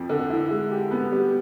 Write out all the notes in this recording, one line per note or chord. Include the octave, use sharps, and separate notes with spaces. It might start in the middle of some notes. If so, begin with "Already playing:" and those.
Already playing: F2 F3
D3
E4
G#3
G4
B3
G3